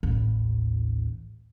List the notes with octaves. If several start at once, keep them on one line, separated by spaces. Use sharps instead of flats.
A1 D#2